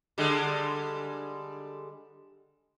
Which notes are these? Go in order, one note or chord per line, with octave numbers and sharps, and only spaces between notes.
D3 G3 G#3